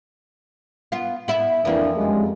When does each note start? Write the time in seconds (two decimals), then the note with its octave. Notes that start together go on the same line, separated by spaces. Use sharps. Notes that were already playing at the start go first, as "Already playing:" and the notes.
0.92 B3 F4
1.28 B3 E4
1.65 F2 E3 A#3 D4
1.96 F#2 G3 G#3